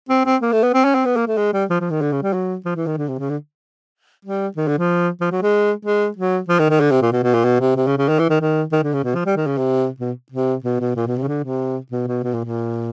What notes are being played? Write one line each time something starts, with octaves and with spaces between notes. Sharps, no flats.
C4
C4
A#3
A3
B3
C4
C#4
C4
B3
A#3
A3
G#3
G3
F3
F3
D#3
D3
C#3
G3
F#3
F3
E3
D#3
D3
C3
C#3
D3
G3
D#3
D3
F3
F3
F#3
G#3
G#3
F#3
F3
D#3
D#3
D3
C3
A#2
B2
B2
A#2
B2
C3
C3
C#3
C#3
D#3
E3
D#3
D#3
D#3
D3
C#3
B2
F3
G3
D#3
C#3
C3
B2
C3
B2
B2
A#2
B2
C3
C#3
D3
C3
B2
B2
B2
A#2
A#2